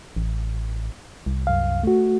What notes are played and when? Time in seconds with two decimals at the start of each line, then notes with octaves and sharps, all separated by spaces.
0.16 A1
1.26 C2
1.47 F#2 F5
1.83 A3 F#4